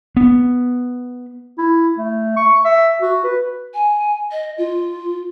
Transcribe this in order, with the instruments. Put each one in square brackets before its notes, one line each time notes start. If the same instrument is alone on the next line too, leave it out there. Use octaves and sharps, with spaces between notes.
[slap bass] B3
[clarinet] E4
A3
C#6
E5
F#4
B4
[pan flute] G#5
D#5
F4